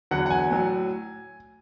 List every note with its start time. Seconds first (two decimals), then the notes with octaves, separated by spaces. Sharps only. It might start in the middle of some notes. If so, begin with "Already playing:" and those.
0.11 E2 D3 F#3 F#5
0.26 F#5
0.31 G#5
0.51 A2 F#3